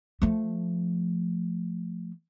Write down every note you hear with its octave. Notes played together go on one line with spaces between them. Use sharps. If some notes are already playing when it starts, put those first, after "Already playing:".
F3 A3